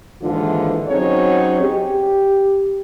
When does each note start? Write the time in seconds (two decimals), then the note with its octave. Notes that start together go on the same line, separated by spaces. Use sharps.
0.22 D#2 G#2 D3 E3 F4
0.89 F#3 C4 C#4 D#4 G#4 C#5
1.61 G4